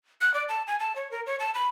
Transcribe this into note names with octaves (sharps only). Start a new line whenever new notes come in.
F#6
D5
A5
G#5
A5
C#5
A#4
C#5
A5
B5